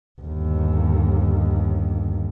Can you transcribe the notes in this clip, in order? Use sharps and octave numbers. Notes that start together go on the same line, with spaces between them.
G1 D#2